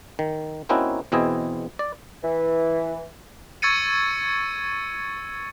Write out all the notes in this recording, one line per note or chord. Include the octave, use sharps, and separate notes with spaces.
D#3
A#3 C4 C#4 D#4 E4 F#4
E2 B2 C4 E4 G#4 D#5
D5
E3
C#6 E6 G#6 A6 C#7 D#7